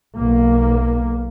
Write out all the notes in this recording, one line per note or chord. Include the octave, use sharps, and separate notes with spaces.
B1 A#3